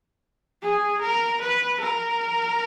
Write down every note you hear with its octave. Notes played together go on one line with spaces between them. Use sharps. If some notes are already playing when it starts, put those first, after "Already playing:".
G#4
A#4
B4
A#4